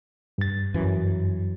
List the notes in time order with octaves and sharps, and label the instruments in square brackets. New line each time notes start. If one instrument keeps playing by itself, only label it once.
[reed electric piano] G2 A6
[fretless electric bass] F#2 E3